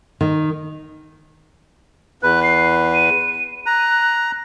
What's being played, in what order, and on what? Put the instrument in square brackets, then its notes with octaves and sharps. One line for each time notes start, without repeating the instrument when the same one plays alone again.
[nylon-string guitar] D#3
[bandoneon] E2 B4 [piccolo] F#6
[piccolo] C7
D#7
[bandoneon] A#5 [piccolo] F#6